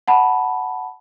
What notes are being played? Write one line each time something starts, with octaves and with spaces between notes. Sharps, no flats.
F#5 A5 B5